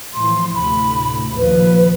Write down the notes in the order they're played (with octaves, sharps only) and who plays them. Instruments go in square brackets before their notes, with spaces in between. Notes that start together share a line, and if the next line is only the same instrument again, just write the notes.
[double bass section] A2 E3 F3 [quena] C6
[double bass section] D2 A2 C3 [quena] B5
[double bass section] A#1 D#2 F3 [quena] B4